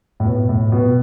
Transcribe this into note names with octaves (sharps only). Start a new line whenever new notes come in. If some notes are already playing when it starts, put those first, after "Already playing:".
A2
B2
A2
B2